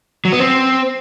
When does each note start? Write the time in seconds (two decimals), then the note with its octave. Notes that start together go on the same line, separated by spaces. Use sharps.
0.25 F#3
0.32 B3
0.40 C4